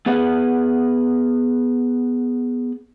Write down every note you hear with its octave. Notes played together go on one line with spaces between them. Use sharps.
B3 G#4 B4 F#5